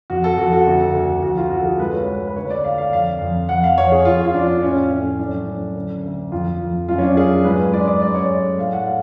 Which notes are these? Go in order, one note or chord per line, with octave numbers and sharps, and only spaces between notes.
F2 F#4
A4
F2 F#4
F#4
D2
D2
F2 F#4
F4
F2 F#4
A4
G#4
G#2 B4
C#5
G#3 B4
B4
D2 C#5
D5
A3 F5
F5
F2 F5
F2
F2 F#5
F5
F2 C#5
G#4
F2 F4
F4
F2 D4
A2 C#4
A2 C#4
F#2 D4
F#2
D2
D2
F2 F4
F2
F#2 F4
C#4
D4
F#2 G#4
G#2 B4
G#3 D5
D5
F#2 D5
C#5
A3 D5
A2 F5
F#5
G#3 F5